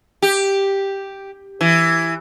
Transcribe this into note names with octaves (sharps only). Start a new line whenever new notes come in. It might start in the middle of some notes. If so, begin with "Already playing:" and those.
G4
E3